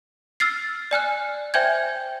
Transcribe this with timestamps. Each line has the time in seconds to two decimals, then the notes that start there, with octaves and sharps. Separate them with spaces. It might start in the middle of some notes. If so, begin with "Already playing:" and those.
0.40 E6 F6 A6 C7
0.91 D5 G#5 F6 F#6
1.54 C5 E5 G5 G#5 G6 G#6